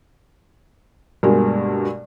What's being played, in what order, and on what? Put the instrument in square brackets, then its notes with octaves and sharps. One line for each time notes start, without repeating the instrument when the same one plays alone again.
[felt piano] G2 B2 G#3 A#3